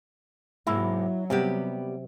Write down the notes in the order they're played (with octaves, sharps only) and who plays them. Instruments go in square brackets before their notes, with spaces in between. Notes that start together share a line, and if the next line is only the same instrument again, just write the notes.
[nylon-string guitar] G#2 C3 A#3 [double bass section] F#3 [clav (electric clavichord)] E4
[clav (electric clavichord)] C3 [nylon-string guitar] G3 B3 G4